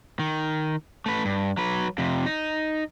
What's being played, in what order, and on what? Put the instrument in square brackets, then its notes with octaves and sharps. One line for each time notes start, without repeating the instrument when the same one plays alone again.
[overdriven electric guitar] D#3
A3 B4
G2
F#3 B4
F2 C3
D#4